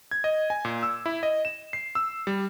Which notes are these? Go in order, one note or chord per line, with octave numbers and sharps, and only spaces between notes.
G#6
D#5
G#5
A#2
E6
E4
D#5
E7
C7
E6
G3